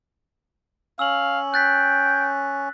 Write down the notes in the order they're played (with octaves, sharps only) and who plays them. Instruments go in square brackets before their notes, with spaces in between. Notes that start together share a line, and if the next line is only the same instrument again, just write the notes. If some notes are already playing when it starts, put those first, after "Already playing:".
[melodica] C#4 [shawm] F5 [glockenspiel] E6 F#7
[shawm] G5 [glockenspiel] F#6 A6 B6